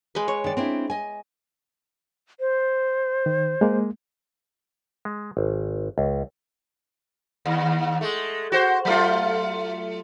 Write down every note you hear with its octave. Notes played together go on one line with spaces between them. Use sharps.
G#3 B4
C#5
D#3 D5
C4 D4 E4
D#5 G#5
C5
D#3
G#3 A#3
G#3
G#1
C#2
D#2
G#3 A3
F#4 C5
F#3 A3 F4